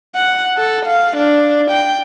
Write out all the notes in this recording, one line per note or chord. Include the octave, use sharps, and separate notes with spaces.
F#5
A4
F5
D4
G5